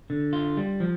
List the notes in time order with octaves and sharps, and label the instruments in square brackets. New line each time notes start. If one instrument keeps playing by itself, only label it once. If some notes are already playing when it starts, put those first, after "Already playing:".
[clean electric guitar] D3
F4
G3
F3